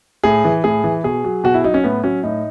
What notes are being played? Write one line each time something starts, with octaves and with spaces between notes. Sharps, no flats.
A2 G#4
E3
A2 G#4
E3
B2 G#4
F#3
B2 F#4
E4
F#3 D#4
C#4
A2 B3
F#3 C#4
A2 D#4